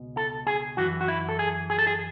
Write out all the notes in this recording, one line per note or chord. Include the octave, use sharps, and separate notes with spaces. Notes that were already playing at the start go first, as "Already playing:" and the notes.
Already playing: C#2 B2
A4
G#4
F#2 E3 F#4
F#4
E4
A4
G#4
G#4
A4
G#4